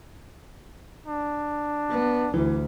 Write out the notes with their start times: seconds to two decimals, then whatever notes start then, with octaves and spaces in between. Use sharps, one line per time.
1.06 D4
1.90 B3
2.34 D2 E3